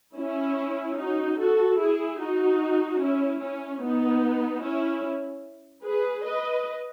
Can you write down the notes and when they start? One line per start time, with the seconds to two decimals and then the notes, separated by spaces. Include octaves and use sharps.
0.17 C#4 E4
0.97 D#4 F#4
1.38 F#4 A4
1.79 E4 G#4
2.19 D#4 F#4
3.00 C#4 E4
3.42 C#4
3.82 B3 D#4
4.63 C#4 E4
5.84 G#4 B4
6.25 B4 D#5